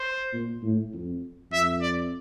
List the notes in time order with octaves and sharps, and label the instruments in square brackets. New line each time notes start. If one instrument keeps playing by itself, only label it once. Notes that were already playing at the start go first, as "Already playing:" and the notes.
Already playing: [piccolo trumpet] C5
[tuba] A#2
A2
F2
[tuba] F2 [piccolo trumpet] E5
[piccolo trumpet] D5